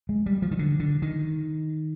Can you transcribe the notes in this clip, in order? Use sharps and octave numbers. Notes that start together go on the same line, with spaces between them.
G#3
G3
F3
D#3
D3
D3
D#3